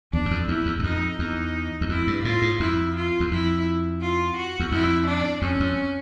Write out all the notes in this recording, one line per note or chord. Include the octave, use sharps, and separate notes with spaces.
E2 D4
F#2
F2
E2 E4
E2
F#2
F2 D#4
E2 D#4
E2
F2 E4
G2
A2 F4
G#2
F2 E4
F4
E2
F2 E4
F4
F#4
E2
F2 E4
D4
F2 C#4
F2